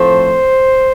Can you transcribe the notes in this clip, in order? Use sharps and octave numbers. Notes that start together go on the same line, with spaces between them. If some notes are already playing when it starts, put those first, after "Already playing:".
Already playing: A2 F3 A3 C4 C5